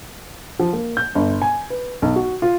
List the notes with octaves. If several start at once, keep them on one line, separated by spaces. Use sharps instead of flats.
F3
A#3
G6
G1
G#5
B4
B1
F#4
F4